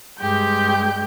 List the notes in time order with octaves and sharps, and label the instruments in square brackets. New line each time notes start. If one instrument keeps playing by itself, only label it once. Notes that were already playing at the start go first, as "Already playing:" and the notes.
[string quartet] G2 G#3 G4 G6